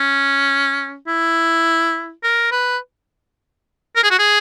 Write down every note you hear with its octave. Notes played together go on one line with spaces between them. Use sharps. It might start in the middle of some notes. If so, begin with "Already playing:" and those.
Already playing: C#4
E4
A#4
B4
A#4
G#4
F#4
G#4